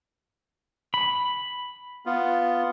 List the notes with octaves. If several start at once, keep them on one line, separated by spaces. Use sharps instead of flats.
B5
B3 F4